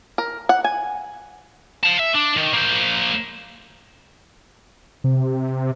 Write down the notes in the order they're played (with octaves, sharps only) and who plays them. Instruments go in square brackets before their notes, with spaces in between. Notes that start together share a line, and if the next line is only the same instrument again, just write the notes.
[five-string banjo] A#4
F#5
G#5
[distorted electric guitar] F5 A5
E5
D4
D#3
A#3 C5
[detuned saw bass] C3